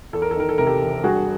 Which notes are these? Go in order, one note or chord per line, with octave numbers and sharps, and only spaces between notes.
E2 A4
A#4
A4
D#3 A#4
A4
C3 A#4
G4 A4
E1
G2 F#4 G#4